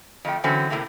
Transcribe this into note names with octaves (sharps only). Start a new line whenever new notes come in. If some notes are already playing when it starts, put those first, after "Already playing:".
F2 F3 A3 G5
D3 E3 F#3 C4 C#4
A2 C3 A3 A#3